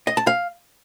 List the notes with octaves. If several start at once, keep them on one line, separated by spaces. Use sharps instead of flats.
D#5
A5
F5